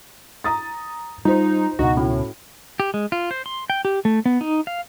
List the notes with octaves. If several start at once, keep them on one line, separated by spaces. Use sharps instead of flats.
A#5 D#6 A6
G3 D#4 F4 C5
C#2 B2 D#4 F#4 F#5
A2 C#4 E4 F#4
G4
G#3
F4
C5
C6
G5
G4
A3
B3
D#4
F5